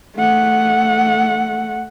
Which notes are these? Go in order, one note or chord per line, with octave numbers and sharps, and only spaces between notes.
A3 F#5